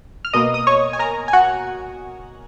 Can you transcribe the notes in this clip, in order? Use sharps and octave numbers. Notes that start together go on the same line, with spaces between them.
F6
B2 A#3 D#5 D#6
D#6
C#5 C#6
G#5
A#4 A#5
G#5
F#4 F#5